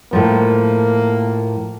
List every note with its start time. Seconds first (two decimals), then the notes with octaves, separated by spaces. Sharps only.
0.13 A2 F3 A#3